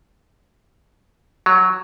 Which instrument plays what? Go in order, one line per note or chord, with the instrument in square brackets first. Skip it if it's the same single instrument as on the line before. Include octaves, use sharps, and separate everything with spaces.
[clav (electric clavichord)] F#3